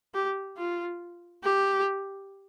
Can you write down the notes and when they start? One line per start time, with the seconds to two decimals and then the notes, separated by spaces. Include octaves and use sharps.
0.14 G4
0.57 F4
1.43 G4